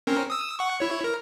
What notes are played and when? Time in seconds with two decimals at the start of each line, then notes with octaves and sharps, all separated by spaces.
0.07 C4 C#4 A#4
0.30 D#6 E6
0.59 F#5 C#6
0.80 E4 C#5
1.04 A#4